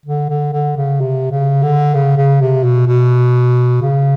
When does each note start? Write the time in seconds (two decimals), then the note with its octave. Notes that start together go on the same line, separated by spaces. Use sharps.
0.06 D3
0.30 D3
0.53 D3
0.77 C#3
1.00 C3
1.31 C#3
1.63 D3
1.94 C#3
2.17 C#3
2.41 C3
2.64 B2
2.87 B2
3.82 C#3